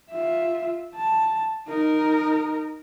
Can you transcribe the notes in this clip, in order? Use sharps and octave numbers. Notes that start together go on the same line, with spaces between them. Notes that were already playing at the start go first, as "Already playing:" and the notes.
F4 E5
A5
D#4 A#4